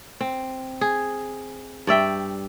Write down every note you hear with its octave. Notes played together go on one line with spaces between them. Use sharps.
C4
G#4
G2 D5 E5 G5